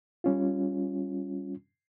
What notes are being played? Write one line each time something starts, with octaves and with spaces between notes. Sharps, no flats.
G3 C#4 F4